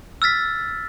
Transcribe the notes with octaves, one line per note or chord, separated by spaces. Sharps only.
E6 F6 A6 B6